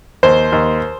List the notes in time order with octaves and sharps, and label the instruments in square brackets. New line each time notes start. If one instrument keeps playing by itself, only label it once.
[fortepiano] D#2 C5
D#2